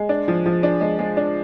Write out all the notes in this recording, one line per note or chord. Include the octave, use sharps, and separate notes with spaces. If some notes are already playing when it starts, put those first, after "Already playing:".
Already playing: G#3
D4
F3
F3
D4
G#3
G#3
D4